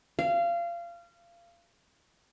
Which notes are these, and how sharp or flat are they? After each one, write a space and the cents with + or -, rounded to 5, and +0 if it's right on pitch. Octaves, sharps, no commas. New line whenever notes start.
F5 -25